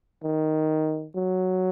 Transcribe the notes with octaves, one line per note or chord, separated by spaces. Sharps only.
D#3
F#3